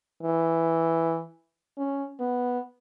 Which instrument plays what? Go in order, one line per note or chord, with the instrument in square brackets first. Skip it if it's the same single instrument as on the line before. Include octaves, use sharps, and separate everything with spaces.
[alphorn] E3
C#4
B3